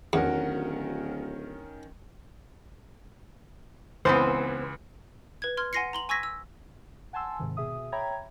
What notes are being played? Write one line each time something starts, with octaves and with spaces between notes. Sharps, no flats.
D1 E2 D#3 C#4 F#4 A#4 F#5
C#2 E3 B3 C4 C5
B4 G#6
C6 F6 G#6
F#5 G#5 C6 A#6 C7 C#7
A#5 C6 F#7
G#5 C#6 E6 G#6 A#6 B6
E6
F#5 G#5 A5 C6 E6
G#2 C3 D#3
B2 G#4 E5 D#6
C#5 E5 G5 A#5 B5 G#6